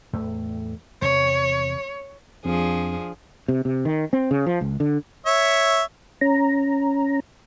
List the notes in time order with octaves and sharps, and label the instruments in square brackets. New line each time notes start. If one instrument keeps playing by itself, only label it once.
[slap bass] E2 A2 A3
[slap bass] E2 C3 [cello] C#5
[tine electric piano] F2 [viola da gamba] F3 D4 G#4
[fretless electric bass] C3
C3
D#3
C4
C#3
F3
C#2
D3
[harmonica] C#5 E5
[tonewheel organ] C#4 A#5